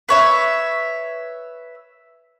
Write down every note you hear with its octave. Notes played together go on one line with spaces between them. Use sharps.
B4 C#5 E5